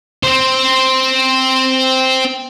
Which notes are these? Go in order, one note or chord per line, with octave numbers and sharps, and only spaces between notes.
C4 C5